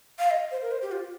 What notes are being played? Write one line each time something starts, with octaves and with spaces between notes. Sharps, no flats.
F5
D#5
C5
A#4
C5
G4
F4